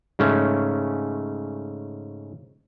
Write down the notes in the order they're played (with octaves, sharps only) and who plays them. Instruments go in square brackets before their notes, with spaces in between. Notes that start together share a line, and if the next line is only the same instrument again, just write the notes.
[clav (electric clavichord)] G#2 C#3 A3 C#4